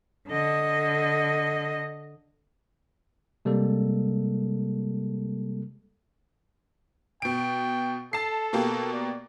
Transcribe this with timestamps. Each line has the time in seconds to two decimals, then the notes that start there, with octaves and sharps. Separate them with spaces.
0.28 D3 D#5
3.45 C3 G3 G#3 A#3 A4
7.22 B2 G5 D7
8.13 A4 A5 C7
8.53 B2 A#3 G4
8.93 D5